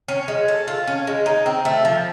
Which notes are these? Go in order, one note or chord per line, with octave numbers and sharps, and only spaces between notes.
C#4
G#3
A4
F4
C#4
G#3
D#4
C4
A3
F3